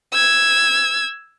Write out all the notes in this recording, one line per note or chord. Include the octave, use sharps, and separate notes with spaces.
E6 G#6